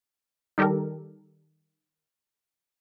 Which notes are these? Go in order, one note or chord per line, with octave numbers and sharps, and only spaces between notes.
D#3 G3 G4 A4 A#4